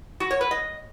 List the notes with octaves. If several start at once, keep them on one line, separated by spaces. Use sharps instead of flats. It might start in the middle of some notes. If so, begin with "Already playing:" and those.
F#4
C#5
B4
D#5